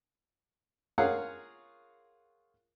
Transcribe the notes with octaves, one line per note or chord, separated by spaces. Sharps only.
F4 G#4 A#4 C#5 F5 F#5